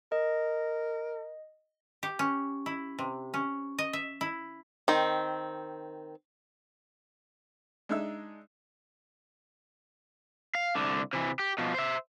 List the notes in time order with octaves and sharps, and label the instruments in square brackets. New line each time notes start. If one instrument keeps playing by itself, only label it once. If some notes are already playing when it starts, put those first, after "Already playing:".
[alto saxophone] A#4 [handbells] D#5
[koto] G4
C#4
E4
C3
C#4
D#5
E5
E4
[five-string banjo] D#3 C4
[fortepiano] G#3 D4 D#4 E5 E6
[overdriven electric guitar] F5
C2 D3
C3 E3
G4
B2 F3
C5 E5